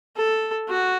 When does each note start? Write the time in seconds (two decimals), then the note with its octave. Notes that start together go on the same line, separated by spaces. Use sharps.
0.17 A4
0.68 F#4